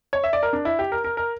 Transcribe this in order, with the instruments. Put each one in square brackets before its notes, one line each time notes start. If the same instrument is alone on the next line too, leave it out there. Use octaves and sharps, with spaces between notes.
[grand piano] C#5
E5
D5
A#4
D4
E4
G4
A#4
A#4
A#4